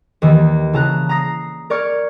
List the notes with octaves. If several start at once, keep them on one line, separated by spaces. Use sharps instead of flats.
D#2 D#3 E3 G3
C#3 E4 A5 A#5 D#6 F#6
A#5 D#6 A#6 C7
A#4 D5 C#6 F6 G#6